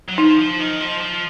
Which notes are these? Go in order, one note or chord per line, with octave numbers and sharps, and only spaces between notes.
F#3
F3 D#4
F3
D#3
F3
F3